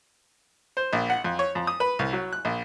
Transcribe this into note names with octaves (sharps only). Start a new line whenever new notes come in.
C5
A#1
F#5
F2
C#5
F2
D#6
B4
C2
F#3
F#6
A#1